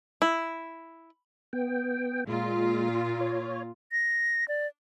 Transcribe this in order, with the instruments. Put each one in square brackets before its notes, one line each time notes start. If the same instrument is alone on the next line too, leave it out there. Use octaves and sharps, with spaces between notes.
[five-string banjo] E4
[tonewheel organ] B3 G5
[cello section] A#2 F4 [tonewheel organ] G#3
[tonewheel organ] C#5
[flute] A#6
D5